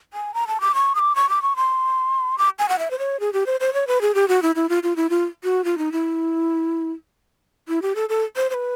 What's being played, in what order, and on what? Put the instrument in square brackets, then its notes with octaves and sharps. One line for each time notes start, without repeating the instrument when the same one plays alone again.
[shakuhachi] G#5
A#5
A5
D6
C#6
D#6
D6
C#6
D6
C#6
C6
D6
G#5
F#5
E5
C5
C#5
G#4
G4
C5
C5
C#5
B4
G#4
G4
F#4
E4
E4
F4
F4
E4
F4
F#4
F4
D#4
E4
E4
G4
A4
A4
C5
C5
B4